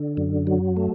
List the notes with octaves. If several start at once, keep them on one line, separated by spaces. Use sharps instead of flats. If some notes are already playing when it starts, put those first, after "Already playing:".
Already playing: D3
F#2
F#3
A3